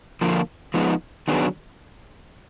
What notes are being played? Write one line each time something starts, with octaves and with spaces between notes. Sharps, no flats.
D3 F3 A#3 F4
F3 G#3 B3 D#4
D#3 F#3 B3 D4 G#4